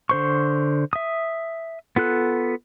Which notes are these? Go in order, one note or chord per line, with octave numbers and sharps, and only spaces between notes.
D3 C5 C#6
E5 D#6
B3 F4 A4 F#6